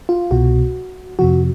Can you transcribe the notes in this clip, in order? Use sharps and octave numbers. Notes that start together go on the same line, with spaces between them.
F4
C2 B2 F#4
F2 C3 F3 F#4